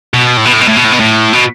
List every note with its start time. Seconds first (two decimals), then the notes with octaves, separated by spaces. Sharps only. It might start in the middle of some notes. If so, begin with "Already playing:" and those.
0.14 B2
0.37 A2
0.45 B2
0.53 A2
0.61 B2
0.68 A2
0.76 B2
0.84 A2
0.92 B2
1.00 A2
1.33 B2